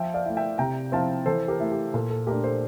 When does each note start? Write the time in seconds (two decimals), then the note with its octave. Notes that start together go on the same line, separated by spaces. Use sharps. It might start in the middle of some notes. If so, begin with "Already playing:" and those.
Already playing: F3 E5 G5
0.14 D5 F5
0.26 A3 E4
0.37 E5 G5
0.58 C3 G5 A#5
0.92 F3 C4 E4 F5 A5
1.26 E3 A4 C5
1.48 G4 A#4
1.60 A3 E4
1.71 G4
1.93 A#2 A4
2.10 A4
2.27 A3 D4 G4 A#4
2.44 A4 C5